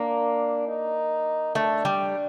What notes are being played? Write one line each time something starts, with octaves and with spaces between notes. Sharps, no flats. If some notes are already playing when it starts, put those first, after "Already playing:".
Already playing: A#3 D4
D#4
A3 D4
G3